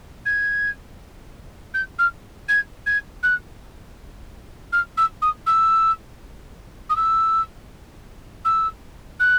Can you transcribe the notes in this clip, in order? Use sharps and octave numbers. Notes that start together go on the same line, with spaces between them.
G#6
G6
F6
G#6
G#6
F#6
F6
E6
D#6
E6
D#6
E6
E6
F#6